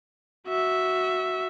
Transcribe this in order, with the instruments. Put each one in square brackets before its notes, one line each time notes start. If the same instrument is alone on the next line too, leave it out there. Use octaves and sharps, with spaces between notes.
[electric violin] F#4 E5